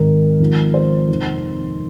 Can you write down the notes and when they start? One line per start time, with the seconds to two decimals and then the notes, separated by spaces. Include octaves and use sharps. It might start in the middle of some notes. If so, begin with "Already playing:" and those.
Already playing: G#1 G#2 D#3 A#4
0.39 G#1 G#2 F3
0.74 C5
1.08 F1 D#2 D#3